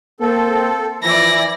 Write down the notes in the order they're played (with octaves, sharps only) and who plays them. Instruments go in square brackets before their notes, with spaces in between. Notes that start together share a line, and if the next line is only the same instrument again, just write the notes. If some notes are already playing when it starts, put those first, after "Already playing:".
[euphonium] A#3 [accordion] C4 A4
[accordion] E3 E4 [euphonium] F3 [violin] D5 A#6